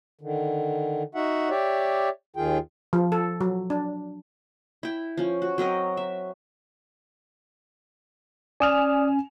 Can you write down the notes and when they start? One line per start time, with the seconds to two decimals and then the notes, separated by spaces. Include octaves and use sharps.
0.21 D3 D#3
1.15 D#4 F#4 E5 F#5
1.50 G4 C#5 D5 E5
2.36 D#2 D#3 F4 G#4 G5
2.93 F3
3.12 A4
3.41 F#3
3.70 D4
4.83 E4 G5
5.17 F3 C#4
5.42 F#4
5.58 F#3 C4 A#4 D#5
5.97 E5
8.60 C#4 D5 G#5 D#6 F6 E7 F7